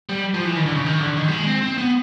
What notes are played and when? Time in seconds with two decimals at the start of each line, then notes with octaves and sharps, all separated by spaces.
0.09 G3
0.34 F3
0.45 E3
0.55 D#3
0.66 D3
0.75 C#3
0.86 D#3
1.01 D3
1.17 D#3
1.28 G3
1.31 G#3
1.47 C4
1.62 C4
1.78 B3